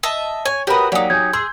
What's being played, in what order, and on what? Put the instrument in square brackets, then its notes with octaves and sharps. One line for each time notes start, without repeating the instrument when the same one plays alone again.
[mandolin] D#5 E5 A5
[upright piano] C#5 [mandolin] G#5
[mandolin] F#4 D#5 [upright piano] G4 A#4 B4 [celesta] C#5 B5
[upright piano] F#3 A#3 [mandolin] D#4 G4 [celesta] D5 F#5 G#5
[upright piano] F#3 G#5 [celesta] G6 G#6
[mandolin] G#4 [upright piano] C6 E6